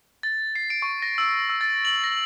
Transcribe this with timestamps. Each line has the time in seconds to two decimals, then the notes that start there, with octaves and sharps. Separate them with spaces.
0.23 A6
0.56 C7
0.70 D7
0.82 C#6
1.02 A#6
1.18 E6
1.49 E6
1.61 A6
1.85 F#7
2.04 A#6